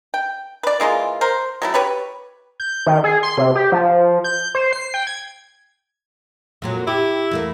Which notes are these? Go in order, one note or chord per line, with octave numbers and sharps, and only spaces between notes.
G5
B4 D5
E3 G#3 A#3 F4
A#4 C5
F#3 A3 E4
G4 B4 C#5 B5
G6
D#3
G#4
C6
C3
G4
F3
G6
C5
C7
G5
G#6
F2 A#2 F#3
E4 G4
E2 A3 A#3